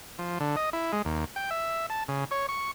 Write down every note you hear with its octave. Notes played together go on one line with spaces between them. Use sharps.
F3
D3
D#5
E4
G#3
D#2
G5
E5
A5
C#3
C#5
C#6